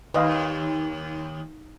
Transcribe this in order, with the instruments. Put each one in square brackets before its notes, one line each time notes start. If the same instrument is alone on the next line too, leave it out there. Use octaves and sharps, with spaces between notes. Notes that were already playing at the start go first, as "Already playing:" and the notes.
[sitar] D#2 [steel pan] B4 D#5 F5